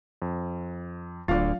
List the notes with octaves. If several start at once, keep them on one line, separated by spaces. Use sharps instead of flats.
F2
D1 D2 D3 F#3 F4 F5 A6